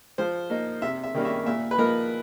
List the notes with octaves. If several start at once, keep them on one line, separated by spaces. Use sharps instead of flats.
F3 C5
A#3 D#4
C3 E5
E5
D#3 G3 A#3 C#4
E5
A#2 E5
B4
F3 A#3 D#4 A#4